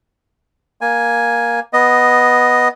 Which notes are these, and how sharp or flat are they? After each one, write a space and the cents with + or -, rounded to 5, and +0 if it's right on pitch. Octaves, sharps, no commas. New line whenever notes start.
A#3 +10 G#5 +0
B3 +0 D#5 +0